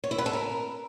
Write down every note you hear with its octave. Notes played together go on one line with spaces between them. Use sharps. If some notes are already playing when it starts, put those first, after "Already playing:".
C#5
E4
B4
A4
A#4